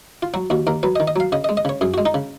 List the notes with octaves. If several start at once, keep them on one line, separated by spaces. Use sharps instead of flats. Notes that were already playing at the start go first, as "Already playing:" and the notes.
F4
F#3 F#4
D#2 F#4
D#2 A#4
F#3 B4
D#5
D#3
D#5
F#3 F5
C#3 D#5
D#5
G#3
D#5
C#3 C#5
F#2 G#4
F#4
G#3
D#4
C#3